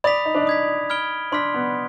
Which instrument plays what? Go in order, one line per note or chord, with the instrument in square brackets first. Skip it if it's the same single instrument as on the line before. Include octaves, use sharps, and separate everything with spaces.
[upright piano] D5 [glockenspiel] B5 D#6 B6 F7
[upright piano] D#4
D4
D#4
[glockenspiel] D#6 G#6 B6
B5 F6 G#6 D7 G7
[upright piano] D4 [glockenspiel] C6 F6 B6
[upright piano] B3